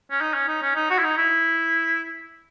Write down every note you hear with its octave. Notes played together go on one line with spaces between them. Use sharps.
C#4
D#4
C#4
D#4
C#4
D#4
F#4
E4
D#4
E4